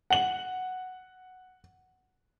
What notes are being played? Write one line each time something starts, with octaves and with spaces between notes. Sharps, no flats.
F#5 F#7